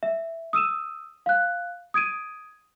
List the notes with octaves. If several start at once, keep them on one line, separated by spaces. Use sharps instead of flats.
E5
D#6 E6 D#7 E7
F5 F#6
D#6 G#6 D7 D#7